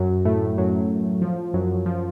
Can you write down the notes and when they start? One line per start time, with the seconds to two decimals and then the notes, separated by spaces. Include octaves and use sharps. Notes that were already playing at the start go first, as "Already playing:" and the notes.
Already playing: F#2 F#3
0.25 A2 A3
0.58 F#2 F#3
1.22 F3
1.54 F#2 F#3
1.86 F3